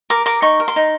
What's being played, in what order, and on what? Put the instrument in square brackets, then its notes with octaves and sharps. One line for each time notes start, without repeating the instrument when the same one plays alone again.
[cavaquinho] A#4 D6
A#4 D6
D#4 C#6
A#4
C6
D#4